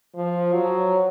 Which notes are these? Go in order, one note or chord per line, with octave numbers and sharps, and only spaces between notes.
F3
F#3